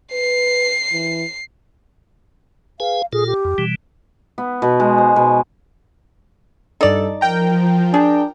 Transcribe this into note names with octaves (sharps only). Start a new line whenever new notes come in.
B4 C7
E3
G#4 B4 F5 G#5
A#2 F4 G#4 A4
G4
F2
B2 E3 G3
B3
B2
G#3
C5
B2
G2 D#4 A4 D5
F3 A#4 G5 A#5
D4 G#4